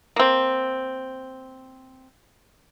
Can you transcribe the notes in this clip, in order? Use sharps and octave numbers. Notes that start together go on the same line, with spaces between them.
A#3 C4